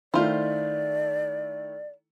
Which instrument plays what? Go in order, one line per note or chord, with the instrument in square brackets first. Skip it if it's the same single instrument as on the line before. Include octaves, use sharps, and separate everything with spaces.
[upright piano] D#3 A3 E4 [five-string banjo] F4 C5 [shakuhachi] D5